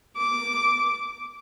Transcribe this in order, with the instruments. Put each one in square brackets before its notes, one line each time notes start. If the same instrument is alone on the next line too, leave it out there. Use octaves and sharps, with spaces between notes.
[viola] D6